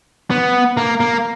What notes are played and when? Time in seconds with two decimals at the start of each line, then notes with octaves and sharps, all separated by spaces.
0.30 B3
0.77 A#3
1.00 A#3